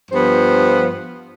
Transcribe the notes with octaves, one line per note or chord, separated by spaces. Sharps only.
G2 F3 B3 C5